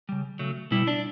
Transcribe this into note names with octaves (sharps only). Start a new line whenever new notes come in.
C#3 G3
C#3 F#3 A3
B2 G3 E4
D4